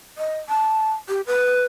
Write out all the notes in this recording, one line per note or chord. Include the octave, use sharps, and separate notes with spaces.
D#5
A5
G4
B4